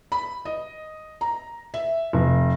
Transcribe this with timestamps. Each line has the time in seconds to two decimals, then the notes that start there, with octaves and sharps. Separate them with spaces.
0.12 B5
0.45 D#5
1.21 A#5
1.74 E5
2.13 F1